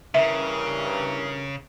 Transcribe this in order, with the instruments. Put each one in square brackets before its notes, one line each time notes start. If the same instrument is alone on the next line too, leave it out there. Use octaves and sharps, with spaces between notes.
[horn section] G2 E3 A#4 [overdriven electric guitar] C#3 [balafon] E5